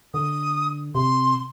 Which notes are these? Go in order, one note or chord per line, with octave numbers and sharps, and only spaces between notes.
D3 D#6
C3 C6